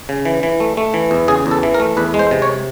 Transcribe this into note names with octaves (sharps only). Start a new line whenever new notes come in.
C#3
E3
E3
A3
A3
E3
E2
C#3 G#4
E2
A4
E3
A#4
A3
E2 B4
G#3
C5
C3
C#5